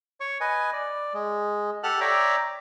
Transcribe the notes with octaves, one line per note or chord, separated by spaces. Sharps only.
C#5 C#6
B4 D#5 G#5
D5
G#3
G4 A4 F#5 A5 F6 F#6
C#5 D5 E5 G5 A#5 D6